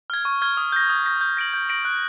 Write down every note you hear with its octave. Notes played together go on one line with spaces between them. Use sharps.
F6 G#6
C#6
F6 G#6
D#6
G6 A#6
D#6
G6 A#6
G6
A#6 D7 F#7
G6
A#6 D7 F#7
F#6